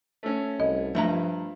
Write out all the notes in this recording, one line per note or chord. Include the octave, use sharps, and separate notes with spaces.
A3 C#4
C2 D#5
G2 F3 A3 B4 A#5